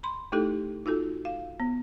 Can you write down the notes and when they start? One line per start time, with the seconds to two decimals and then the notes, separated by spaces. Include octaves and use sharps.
0.03 B5 C6
0.32 A3 D#4 E4 G4 A4
0.86 D#4 F4 F#4 A4
1.25 F5
1.60 B3